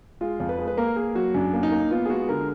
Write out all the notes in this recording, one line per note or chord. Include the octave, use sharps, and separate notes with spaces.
G#3 F4
F2
B4
G#3
B4
A#3 A#4
A#3 G#4
F#3 F#4
F#2 D4
A#3
D#4
A#3
B3 F4
G#4
G#3 F#4
D3 A#4